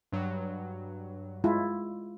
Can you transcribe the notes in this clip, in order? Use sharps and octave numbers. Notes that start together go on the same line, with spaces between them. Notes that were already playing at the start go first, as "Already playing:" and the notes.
G2 F#3
G#3 E4 F4